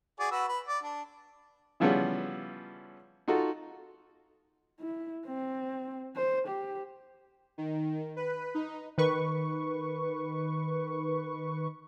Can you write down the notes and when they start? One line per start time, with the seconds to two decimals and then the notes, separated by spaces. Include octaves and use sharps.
0.20 F#4 G#4 D5
0.31 F#4 B4 E6
0.48 B4
0.68 D5
0.83 D4
1.80 C#3 E3 F3 G3 B3 C#4
3.28 D#4 F4 F#4 A4
4.80 E4
5.26 C4
6.16 C5
6.48 G4
7.58 D#3
8.16 B4
8.55 D#4
8.98 D#3 B4 C#6